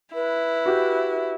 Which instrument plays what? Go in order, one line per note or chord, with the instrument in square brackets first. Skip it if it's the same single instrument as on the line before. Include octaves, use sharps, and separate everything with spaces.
[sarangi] E4 [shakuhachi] B4
[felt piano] F#4 G4